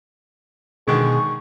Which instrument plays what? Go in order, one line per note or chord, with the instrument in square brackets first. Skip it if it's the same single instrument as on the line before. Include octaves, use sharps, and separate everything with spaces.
[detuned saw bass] B2 [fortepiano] D3 D#3 G#3 [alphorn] G#4 [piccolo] C#6